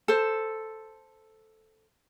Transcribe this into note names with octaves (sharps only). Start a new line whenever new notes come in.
A4 C5